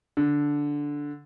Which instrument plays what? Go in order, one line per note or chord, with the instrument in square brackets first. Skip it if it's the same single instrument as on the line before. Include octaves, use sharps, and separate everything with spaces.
[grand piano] D3